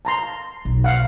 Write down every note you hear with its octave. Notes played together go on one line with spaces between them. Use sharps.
A5 A#5 C6
B1
F5 F#5